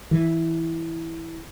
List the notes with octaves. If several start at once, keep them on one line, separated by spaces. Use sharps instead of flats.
E3